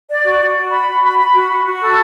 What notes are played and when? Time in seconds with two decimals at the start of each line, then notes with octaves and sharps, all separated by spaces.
0.10 D5
0.25 F#4
0.40 F#4
0.56 F#4
0.71 B5
0.88 F#4
1.03 B5
1.18 B5
1.34 F#4
1.50 F#4
1.65 F#4
1.81 A4